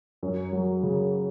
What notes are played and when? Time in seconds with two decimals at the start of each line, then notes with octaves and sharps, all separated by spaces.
0.23 F#2
0.52 F#3
0.83 C#3